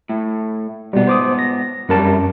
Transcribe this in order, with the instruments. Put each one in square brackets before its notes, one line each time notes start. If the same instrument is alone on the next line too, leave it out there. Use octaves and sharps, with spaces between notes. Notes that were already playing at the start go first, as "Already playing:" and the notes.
[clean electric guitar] A2
[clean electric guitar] G#2 B3 [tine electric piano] B2 G3
[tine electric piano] C5 D6 D#6
A#6
[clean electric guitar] C2 F#3 G3 [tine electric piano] F#2 A#4 A5